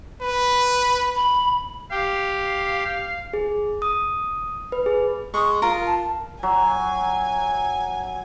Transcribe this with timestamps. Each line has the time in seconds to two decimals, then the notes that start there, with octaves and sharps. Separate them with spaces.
0.21 B4
1.16 B5
1.91 G4 F5
3.33 G#4
3.82 D#6
4.72 B4
4.86 G#4
5.34 G#3 C#6 D#6
5.62 F4 A#4
5.87 A5
6.43 F#3 G#5